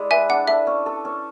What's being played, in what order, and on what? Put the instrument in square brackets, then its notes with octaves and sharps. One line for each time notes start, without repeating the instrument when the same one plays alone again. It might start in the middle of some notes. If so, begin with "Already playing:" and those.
Already playing: [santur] G#3 E4 G#4 D5
[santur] B4 [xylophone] E5 G#5
[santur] D4 [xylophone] F#5
[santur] A4 [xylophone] E5
[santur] C#4
A4
C#4